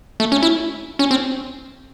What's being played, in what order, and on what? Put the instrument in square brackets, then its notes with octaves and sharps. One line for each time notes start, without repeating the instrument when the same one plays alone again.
[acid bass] A3
C#4
E4
C#4
C4